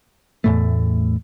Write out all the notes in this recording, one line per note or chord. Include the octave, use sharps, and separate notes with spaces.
E2 A2 A3